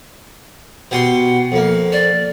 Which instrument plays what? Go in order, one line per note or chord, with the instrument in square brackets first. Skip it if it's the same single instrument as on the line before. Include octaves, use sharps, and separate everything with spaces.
[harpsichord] B2 G4 C6 [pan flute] F#5
[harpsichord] F2 A#3
[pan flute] D5